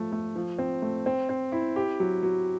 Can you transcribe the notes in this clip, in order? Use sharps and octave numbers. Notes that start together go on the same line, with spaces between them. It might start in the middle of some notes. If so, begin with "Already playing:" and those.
Already playing: F3 A3
A3
F3
C4
A3
C4
C4
E4
G4
F#3
F#3